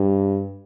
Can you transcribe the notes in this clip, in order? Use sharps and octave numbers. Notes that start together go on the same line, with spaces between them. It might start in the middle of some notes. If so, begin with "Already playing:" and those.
Already playing: G2